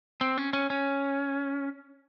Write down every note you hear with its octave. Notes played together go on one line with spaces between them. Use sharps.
C4
C#4
C#4
C#4